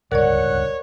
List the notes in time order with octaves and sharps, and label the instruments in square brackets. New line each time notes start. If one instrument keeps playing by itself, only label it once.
[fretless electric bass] D1 C#2 G2 [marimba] A#4 D5 [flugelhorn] C#5 [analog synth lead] F#5